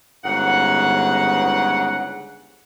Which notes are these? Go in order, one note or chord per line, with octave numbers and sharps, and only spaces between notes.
G1 G#2 C#3 F#5